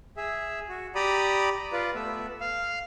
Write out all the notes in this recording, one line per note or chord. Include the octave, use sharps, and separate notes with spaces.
G#4 E5
F#4
G4 D5 A#5 B5 D#6
F4 B4 D5
A3 B3 E5
F5